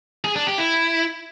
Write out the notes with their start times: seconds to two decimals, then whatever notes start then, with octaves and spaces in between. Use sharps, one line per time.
0.24 G#4
0.36 D4
0.47 G4
0.58 E4